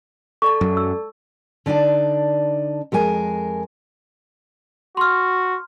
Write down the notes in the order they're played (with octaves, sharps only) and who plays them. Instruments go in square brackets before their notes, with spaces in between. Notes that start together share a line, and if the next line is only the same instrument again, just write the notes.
[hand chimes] A4 D5 A5 [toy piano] C#6
[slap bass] F#2 F#3
[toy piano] E6
[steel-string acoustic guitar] D3 D4 D#4 D5 A5
F2 G#3 A#4 G#5
[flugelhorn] F#4 [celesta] C6 F6